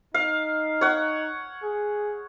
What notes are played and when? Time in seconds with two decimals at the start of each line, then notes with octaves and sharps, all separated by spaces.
0.14 D#4 F5
0.81 C#5 F#5
1.63 G#4